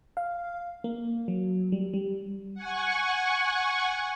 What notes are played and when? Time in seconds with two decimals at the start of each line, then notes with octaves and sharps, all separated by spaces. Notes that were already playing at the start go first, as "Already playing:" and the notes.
0.17 F5
0.84 A#3
1.28 F#3
1.72 G3
1.94 G3
2.54 F#5 G#5 C#6